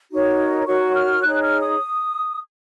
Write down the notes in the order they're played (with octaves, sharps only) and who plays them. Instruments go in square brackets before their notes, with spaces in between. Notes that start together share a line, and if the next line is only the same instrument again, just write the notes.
[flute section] D#4 F#4 A#4 C#5
D#4 F#4 A#4 C#5 C#6
F6
D#4 G#4 C#5 F#6
F6
D#6